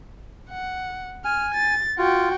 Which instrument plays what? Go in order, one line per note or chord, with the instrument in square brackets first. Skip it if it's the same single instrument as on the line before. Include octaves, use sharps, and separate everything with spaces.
[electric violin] F#5
[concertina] G#5 [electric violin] F6
[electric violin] A6
[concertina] F4 [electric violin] F#4 G5